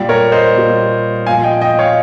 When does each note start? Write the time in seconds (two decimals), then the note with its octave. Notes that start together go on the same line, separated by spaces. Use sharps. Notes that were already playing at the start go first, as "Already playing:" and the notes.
Already playing: A#2 G3
0.09 A#4 C#5
0.32 C5 D#5
0.55 A#2 G3
1.26 A#2 F5 G#5
1.31 F3
1.43 D#5 G5
1.61 D#5 G5
1.79 C#5 F5